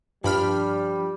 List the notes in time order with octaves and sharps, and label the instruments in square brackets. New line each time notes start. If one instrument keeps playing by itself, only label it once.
[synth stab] G2 B5 F6 [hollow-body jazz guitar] F3 D4 [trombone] G3